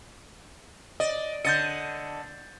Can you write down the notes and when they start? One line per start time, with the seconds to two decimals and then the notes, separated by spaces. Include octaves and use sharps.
1.00 D5 D#5
1.45 D3 D#5 G6 A6 C#7